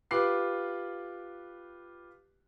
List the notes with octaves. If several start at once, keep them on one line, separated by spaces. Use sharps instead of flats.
F4 G4 B4 D6 F#6 C7